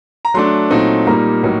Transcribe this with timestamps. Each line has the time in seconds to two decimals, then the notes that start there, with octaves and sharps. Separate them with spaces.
0.25 A#5
0.34 F#3 A3 D4 C6
0.70 A#2 F#3 A3 C4 D#4
1.07 A#2 G3 A#3 D#4 A#5
1.43 A2 F#3 A#3 D#4